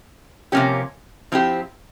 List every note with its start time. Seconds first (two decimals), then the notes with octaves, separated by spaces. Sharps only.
0.52 C3 F3 A#3 C#4 G4
1.32 F3 C4 E4 G4